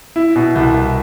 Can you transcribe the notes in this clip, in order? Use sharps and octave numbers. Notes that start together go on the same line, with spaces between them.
E4
B2
C2
C2